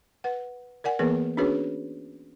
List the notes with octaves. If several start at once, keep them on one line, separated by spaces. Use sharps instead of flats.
B4 F#5
A#4 D5 F#5 G#5
E3 A#3 B3 G#4 A#4 B4
C#4 D4 F#4 G#4 B4 C#5